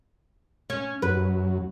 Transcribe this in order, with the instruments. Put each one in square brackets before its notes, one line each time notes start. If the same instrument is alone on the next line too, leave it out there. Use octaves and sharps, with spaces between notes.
[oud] C#4
[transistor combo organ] F#2 [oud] B4